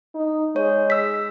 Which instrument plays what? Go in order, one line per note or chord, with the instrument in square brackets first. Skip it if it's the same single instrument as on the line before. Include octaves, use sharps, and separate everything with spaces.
[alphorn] D#4
[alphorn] G#3 [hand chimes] C#5
[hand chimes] E6 B6